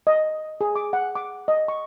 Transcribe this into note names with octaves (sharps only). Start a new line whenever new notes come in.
D#5
G#4
D6
F#5
D6
D#5
C#6